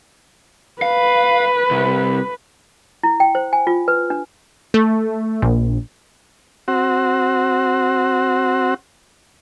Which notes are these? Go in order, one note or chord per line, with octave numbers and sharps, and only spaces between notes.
B4 F5
C2
E4
G5
C5
G#5
F4
B4
D4
A3
A#1
C4 F#4